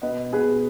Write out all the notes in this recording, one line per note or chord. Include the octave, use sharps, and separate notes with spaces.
B2 B4 D#5
B2 G#4 B4